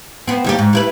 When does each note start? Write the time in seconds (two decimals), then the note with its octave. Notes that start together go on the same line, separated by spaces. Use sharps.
0.28 B3 C4
0.44 D#2 G3 G4
0.59 G#2
0.73 G3 E4 B4